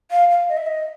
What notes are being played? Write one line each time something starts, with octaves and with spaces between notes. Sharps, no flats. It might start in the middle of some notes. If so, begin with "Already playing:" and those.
F5
F5
D#5
E5
D#5